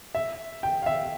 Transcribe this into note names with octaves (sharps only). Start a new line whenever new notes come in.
E5
G5
F5
E5